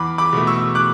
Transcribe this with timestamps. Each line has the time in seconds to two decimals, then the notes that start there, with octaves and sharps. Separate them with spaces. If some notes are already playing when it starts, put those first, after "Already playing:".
Already playing: E2 B5 D6
0.18 B5 D6
0.33 B2 A3
0.47 C#6 E6
0.75 D6 F#6